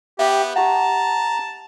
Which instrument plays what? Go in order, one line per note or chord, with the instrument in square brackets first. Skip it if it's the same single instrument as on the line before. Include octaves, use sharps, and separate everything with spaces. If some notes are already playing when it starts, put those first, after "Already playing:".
[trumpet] B3 [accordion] G4 [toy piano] E5
[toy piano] G4 F#5 [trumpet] A5 [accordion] A#5